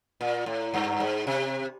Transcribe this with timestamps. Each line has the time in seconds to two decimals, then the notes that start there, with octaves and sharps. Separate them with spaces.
0.21 A#2
0.46 A2
0.74 G2
1.00 G#2
1.27 C3